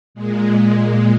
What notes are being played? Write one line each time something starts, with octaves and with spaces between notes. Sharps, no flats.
A#2 G#3